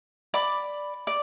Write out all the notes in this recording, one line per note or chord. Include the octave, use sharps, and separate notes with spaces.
D5 B5 D6
D5